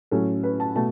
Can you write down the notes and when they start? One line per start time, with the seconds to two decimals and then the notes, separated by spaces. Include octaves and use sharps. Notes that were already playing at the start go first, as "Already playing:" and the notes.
0.11 A2 F#3 C#4 A4
0.43 B4
0.60 A5
0.75 B2 A3 A5